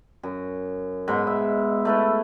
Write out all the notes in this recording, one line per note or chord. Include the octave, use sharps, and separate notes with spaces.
F#2
G#2 B2 B5
E5
A3 E4 B4